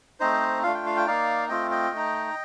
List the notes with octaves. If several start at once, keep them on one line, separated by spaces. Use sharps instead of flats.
A3 C4 D#4 C5 D#5
A3 D4 F4 F5
G5
F5
G5
A#3 D#4 D5 F5
A3 C4 F4 D#5 G5
D#5 G5
A3 D#4